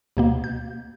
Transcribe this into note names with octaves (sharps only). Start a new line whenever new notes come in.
D2 B2 A#3
G6